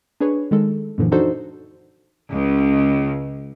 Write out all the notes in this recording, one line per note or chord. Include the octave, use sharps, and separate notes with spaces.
D4 G#4 B4 C#5
D#3 G#3 A4
F#2 A#2 D3 E3 F3
D4 D#4 F#4 A4 C5
C#2